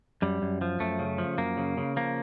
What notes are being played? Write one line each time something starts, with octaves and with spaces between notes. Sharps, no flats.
F#2 G3
F#2
F3
F#2 A3
C#3
F3
F#2 A#3
C#3
C#3
F3 A#3